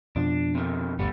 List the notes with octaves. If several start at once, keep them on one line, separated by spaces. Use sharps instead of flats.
F2 B2 F3 D4
C3 D#3
G1 D2 G3 B3